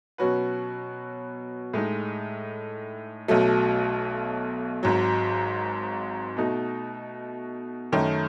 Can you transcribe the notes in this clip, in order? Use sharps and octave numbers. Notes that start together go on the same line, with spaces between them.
B2 F#3 C#4 F#4 B4
A2 G#3 D#4
B1 B2 F#3 A3
G#1 G#2 F#3
B2 A3 D#4 F#4
F#2 D#3 A3 C#4